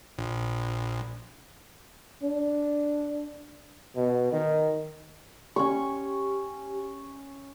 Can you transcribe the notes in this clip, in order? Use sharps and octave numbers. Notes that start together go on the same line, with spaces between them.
A#1
D4
B2
D#3
C#4 G4 C#6